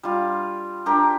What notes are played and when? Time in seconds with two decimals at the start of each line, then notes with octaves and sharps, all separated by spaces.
0.03 G3 F4
0.86 D4 G4 A#4